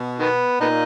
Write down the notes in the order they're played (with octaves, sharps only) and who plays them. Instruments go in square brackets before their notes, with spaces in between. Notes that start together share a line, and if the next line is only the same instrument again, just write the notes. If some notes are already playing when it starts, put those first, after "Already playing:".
Already playing: [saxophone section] B2
[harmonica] D#3 B3
[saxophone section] A#2 [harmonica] B3 D#4